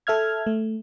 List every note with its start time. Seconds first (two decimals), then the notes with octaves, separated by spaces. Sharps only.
0.07 A4 E5 F6 G#6
0.47 A3